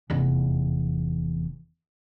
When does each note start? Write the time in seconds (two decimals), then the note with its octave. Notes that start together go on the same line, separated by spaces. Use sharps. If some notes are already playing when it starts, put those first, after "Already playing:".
0.10 F1 E2